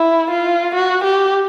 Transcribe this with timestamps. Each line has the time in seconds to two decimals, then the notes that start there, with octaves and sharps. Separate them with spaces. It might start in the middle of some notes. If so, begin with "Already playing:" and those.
Already playing: E4
0.30 F4
0.74 F#4
1.04 G4